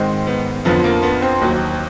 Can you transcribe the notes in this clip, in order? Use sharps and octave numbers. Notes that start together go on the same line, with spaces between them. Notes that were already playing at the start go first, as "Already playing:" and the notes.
Already playing: G#2 D#3 G#3 C4
B3
F2 D3 F3 B3
A#3
B3
C4
D#2 D#3 F#3